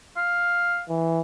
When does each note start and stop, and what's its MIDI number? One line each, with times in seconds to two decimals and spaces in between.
0.16 0.82 77
0.89 1.21 52